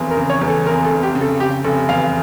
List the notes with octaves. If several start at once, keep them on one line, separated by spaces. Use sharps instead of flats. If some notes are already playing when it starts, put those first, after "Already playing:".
Already playing: F1 E2
A#4
C#3
C#5
E2
A4
F1 A#4
A4
F1
G4
C#3
A4
C#3 G4
F1 A4
E2 F5